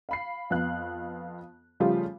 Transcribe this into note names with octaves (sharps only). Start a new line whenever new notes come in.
F5 B5 C7
F2 B3 F5 F#6
C#3 F3 G3 A3 F4 G4